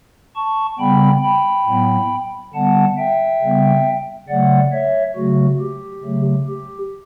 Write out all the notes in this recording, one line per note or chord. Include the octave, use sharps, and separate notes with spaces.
A5 C#6
C#3 G3 B3 G5 B5
G5 B5
A2 F#3 B3
D3 G3 B3 F#5 A5
E5 G5
C#3 G3 B3
C#3 F#3 A3 D5 F#5
C#5 E5
C#3 F#3 A3 F#4
G4
C#3 F#3 A3
G4